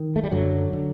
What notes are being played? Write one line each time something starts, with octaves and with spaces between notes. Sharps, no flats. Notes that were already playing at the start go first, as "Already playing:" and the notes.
Already playing: D#3
A3
G3
F#2 D3 F#3
D3